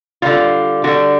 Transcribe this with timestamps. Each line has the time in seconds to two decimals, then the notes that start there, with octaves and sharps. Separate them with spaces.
0.22 D3 G3 F4
0.84 D3 G3 F#4